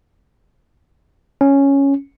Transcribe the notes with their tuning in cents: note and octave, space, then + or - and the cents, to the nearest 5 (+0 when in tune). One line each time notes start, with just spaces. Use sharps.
C#4 +0